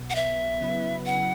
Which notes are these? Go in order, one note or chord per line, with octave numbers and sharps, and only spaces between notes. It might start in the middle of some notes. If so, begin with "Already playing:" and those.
Already playing: B1 B2 B3
F#5
E5
C#3 F#3 B3 E4 B4
F#5